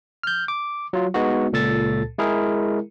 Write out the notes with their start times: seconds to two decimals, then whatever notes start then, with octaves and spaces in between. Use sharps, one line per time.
0.23 F6 G6
0.48 D6
0.93 F#3 F4
1.14 G#3 B3 D#4 F#4
1.53 C#2 A#2 A4 A5 A6
2.18 G#3 E4 G#4 A#4